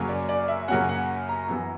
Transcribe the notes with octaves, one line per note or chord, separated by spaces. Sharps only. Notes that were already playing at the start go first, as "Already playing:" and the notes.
Already playing: F#2 C#3 F#3 A#3 C#4
D5
D5
E5
F#2 C#3 F#3 A#3 C#4 F#5
F#5
A#5
F#2 E3 B3 A#5